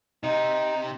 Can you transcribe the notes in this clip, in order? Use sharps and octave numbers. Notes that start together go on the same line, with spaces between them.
C3 D#4